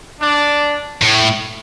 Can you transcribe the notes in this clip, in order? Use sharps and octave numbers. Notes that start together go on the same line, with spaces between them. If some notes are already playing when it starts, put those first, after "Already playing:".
D4
A2